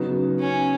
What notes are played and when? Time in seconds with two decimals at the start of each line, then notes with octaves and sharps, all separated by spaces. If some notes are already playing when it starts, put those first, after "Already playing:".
Already playing: C#3 F#3 B3 D#4 F#4
0.40 C#4